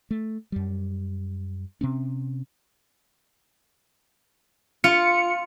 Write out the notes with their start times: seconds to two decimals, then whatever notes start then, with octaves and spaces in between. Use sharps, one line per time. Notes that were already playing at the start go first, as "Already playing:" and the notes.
0.11 A3
0.52 F#2 G3
1.81 C3 C4 C#4
4.84 F4 C#7